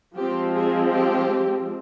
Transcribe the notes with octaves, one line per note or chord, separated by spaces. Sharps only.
F3 G#3 C4 G4
G#4
G4